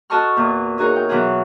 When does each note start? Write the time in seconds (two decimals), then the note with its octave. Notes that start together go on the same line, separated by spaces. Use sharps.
0.10 F#4 A4 D#5 A5 C#6 F6
0.37 E2 A#2
0.78 D#4 F#4 G#4 A#4 C#5
0.96 G5
1.09 B2 E3 F#3 F4 F#4 G#4